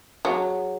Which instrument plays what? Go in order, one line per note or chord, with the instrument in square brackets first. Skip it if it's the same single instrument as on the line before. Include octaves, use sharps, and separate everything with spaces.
[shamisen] F#3 [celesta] G#4 C#5 F#5